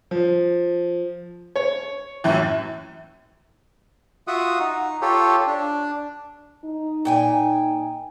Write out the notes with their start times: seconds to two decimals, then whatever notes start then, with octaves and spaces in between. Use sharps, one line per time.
0.11 F3
1.56 C#5
2.24 F#2 A2 E3
4.28 F4 F#4 E5 F#5 D#6
4.59 D#4
5.02 F4 G4 A4 C#5
5.47 D4
6.65 D#4
7.05 A#2 G5 G#5